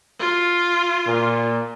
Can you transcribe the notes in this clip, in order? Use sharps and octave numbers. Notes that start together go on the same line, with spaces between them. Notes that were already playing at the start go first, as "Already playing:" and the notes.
F4
A#2